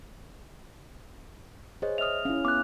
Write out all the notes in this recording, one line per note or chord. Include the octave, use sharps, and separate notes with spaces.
G#4 C5 C#5 D#5
E5 D#6 F6 F7
C#4 E4 F5
B3 D6 F#6